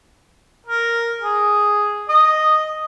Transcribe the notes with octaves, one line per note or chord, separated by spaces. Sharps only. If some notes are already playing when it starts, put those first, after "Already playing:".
A#4
G#4
D#5